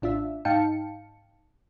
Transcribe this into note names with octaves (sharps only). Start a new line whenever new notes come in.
A1 D4 F4 E5
G#2 D#4 F5 G5 A5 C#7